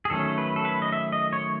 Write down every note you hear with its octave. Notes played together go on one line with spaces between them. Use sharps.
G#4
D#3 F#3 A3 C#4 A4
B4
A4
B4
D#5
E5
D#5
C#5